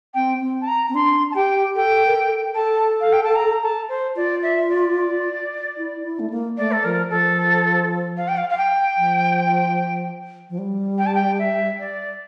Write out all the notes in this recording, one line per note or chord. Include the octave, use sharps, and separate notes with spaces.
C4 G5
C4
A5
A#5
C4
D4 C6
A5
G4 G5
A4 G5
A#4
A4
A4 A5
F5
G5
A5
A#5
A5
C5
F4 D5
E5
D5
E4
E4
A3
A#3
A3 D5
A4
F3 A#4
F3 A4
F5
G5
F5
F5
G5
F3
F3
G3
G5
A5
G5
E5
D5